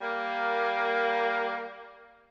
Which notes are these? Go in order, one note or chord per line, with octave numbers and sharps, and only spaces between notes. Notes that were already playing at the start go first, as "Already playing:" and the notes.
G3 A#3